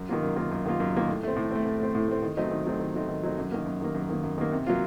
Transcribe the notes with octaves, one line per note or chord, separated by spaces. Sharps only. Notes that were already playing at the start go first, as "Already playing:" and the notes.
Already playing: F#2
D#3 A#3 F4
F#2
D#3 A#3 F4
F#2
D#3 A#3 F4
F#2
D#3 A#3 F4
A2
A3 C4
A2
A3 C4
A2
A3 C4
A2
A3 C4
D#3
F#3 A3 C4 D#4
D#3
F#3 A3 C4 D#4
D#3
F#3 A3 C4 D#4
D#3
F#3 A3 C4 D#4
F#2
D#3 A#3
F#2
D#3 A#3
F#2
D#3 A#3
F#2
D#3 A#3
C3
F#3 A#3 F4